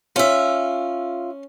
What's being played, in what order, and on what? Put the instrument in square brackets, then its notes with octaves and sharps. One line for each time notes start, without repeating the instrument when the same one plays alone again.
[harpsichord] C#4 [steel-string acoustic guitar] F4 E5